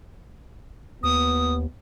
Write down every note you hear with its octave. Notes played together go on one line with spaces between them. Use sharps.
D#2 B3 D#6